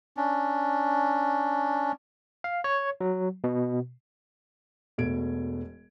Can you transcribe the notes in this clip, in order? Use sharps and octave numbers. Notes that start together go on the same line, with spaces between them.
C#4 D4
F5
C#5
F#3
B2
E1 B2 A3 G#6 D7